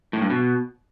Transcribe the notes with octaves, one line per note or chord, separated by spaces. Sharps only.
A2
G2
B2